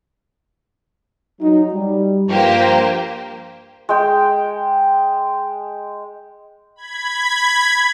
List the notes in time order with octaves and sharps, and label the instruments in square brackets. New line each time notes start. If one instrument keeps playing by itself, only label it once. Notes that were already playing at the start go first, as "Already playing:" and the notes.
[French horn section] F#3 D#4
G3
[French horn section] G2 F3 [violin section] A#3 G4 C5
[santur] G#3 G5
[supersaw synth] B5 G#6